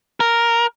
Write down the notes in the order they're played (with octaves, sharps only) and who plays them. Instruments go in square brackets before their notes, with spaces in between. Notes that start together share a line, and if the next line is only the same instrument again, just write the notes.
[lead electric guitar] A#4